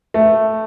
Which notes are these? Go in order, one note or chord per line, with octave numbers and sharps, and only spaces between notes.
A3